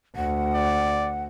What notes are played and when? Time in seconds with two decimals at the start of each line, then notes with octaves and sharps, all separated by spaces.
0.16 D2 F#5
0.54 D5